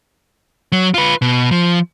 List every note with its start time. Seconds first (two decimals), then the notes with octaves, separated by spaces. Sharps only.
0.72 F#3
0.94 F4 B4
1.22 B2
1.51 F3